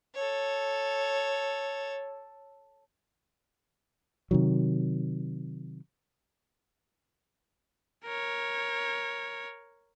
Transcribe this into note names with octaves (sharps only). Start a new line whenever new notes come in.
A4 C#5
C3 D#3 F#3
A#4 C#5